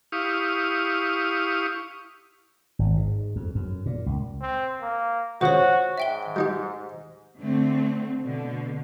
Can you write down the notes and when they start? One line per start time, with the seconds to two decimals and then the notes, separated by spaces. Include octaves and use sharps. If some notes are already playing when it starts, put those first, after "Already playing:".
0.12 E4 G4 F5 C#6 D#6
2.79 G#1
2.97 G#2
3.36 F2
3.55 F#2
3.86 A#2
4.06 C#2
4.41 C4
4.82 A#3
5.41 F2 C#3 F3 F#4 C5 C#5
5.98 G#2 E5 G5 G7
6.36 G3 D#4 G4
7.39 D3 A3 C4
8.22 B2 D3